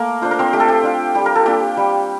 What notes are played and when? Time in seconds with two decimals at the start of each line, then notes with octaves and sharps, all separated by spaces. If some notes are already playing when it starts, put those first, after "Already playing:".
Already playing: A3 A#3 A#4
0.22 D4 F4 C5
0.31 A#4
0.39 C4 C5
0.53 A3 G4
0.60 A4
0.68 G4
0.83 D4 F4
1.15 G3 G4
1.26 A#4
1.35 A4
1.46 A#3 D4 F4 G4
1.77 G3